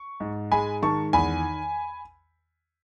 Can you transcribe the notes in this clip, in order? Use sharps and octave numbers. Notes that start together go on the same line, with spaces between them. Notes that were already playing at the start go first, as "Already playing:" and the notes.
Already playing: C#6
G#2
G#3 G#5 B5
D#3 A5 C#6
E2 G#5 B5